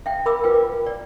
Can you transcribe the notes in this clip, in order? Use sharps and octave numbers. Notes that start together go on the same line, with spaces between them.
E5 G5
A#4 B5 D6 E6
F4 B4 G5
D5